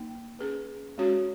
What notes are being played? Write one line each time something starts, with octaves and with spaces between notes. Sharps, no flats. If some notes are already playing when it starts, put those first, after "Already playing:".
Already playing: A#3 D#4
C#4 G#4 B4
G#3 C#4 F#4 C#5